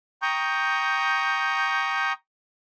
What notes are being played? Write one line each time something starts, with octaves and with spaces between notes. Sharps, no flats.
G5 A#5 C#6 D#6 G6